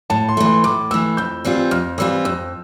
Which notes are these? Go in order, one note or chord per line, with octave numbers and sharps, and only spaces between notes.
A2 A5
C6
E3 A3
C6
A2 D6
E3 A3 E6
F2 G6
E3 G3 C4 F4
F2 F6
E3 G3 C4 F4 E6
F2 E6